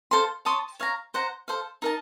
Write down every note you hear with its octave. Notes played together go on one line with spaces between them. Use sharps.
A4 C5 F5 C6
C#5 A5 C6 D#6
C#5 F5 A#5
C5 F#5 A#5
A4 C5 F5
D#4 A#4 D#5 A5